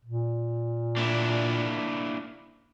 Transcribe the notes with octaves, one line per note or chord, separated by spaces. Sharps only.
A#2
A#3 D4 E4